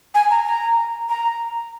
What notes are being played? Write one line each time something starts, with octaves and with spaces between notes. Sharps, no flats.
G#5
A#5
A#5
A#5